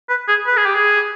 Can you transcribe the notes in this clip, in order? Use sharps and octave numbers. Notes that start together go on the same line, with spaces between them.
B4
G#4
B4
G#4
G4
G#4